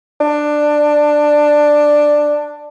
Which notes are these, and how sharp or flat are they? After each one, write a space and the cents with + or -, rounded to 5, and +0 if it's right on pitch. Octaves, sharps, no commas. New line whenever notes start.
D4 +10